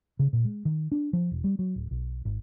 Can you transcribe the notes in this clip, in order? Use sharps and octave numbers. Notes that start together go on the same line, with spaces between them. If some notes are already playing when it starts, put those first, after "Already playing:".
C#3
A#2
G#3
D#3
D4
F3
E1
G3
F#3
D1
B1
G#1